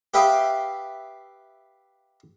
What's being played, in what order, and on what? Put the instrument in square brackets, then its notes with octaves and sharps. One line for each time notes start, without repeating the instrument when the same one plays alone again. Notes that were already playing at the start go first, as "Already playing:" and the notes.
[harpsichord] G4 B4 E5 F5 G5 D#6